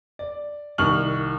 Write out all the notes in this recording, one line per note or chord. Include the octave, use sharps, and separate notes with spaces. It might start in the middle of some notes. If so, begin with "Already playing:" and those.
D5
C2 D#3 C#6 F6 F#7